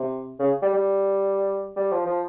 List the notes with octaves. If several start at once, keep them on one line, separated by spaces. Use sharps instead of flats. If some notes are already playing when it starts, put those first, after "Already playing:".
Already playing: C3
C#3
G3
G3
G3
F3
F3